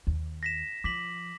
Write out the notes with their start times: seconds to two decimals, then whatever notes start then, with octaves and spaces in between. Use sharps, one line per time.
0.07 D#2
0.43 A#6 B6 E7
0.84 F3 D6 B6 F#7